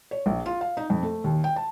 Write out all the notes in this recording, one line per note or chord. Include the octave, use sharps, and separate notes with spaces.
C#5
A#1
F4
F5
D#4
F2
A3
D#2
G5
A5